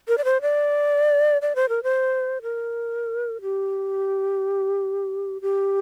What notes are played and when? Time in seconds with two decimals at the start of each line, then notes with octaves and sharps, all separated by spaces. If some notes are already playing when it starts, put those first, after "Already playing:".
0.08 A#4
0.18 D5
0.25 C5
0.42 D5
1.42 D5
1.56 C5
1.69 A#4
1.83 C5
2.42 A#4
3.42 G4
5.42 G4